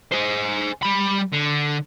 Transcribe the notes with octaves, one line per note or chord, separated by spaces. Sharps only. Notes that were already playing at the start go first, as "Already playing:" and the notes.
G#4 C5
G3 B5
D3